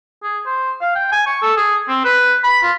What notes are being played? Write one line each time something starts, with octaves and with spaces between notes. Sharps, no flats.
G#4
C5
F5
G5
G#5
C#6
A4
G#4
C4
B4
B5
F4